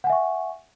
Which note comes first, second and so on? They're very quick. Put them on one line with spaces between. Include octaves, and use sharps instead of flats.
F#5 G#5 E5 C#6